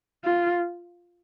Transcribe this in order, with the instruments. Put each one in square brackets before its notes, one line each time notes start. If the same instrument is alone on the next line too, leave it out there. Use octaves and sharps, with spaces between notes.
[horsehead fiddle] F4